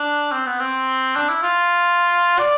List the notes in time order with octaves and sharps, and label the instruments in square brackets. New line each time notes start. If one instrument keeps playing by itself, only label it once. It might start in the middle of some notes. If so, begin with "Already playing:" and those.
Already playing: [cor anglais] D4
C4
B3
C4
D4
E4
F4
D5